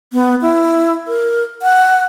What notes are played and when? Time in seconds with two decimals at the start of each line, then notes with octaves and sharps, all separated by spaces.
0.13 B3
0.42 E4
1.08 A#4
1.62 F#5